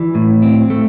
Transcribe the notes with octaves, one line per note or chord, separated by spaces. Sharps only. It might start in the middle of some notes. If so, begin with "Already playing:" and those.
Already playing: E3 D5
A2
C4
A3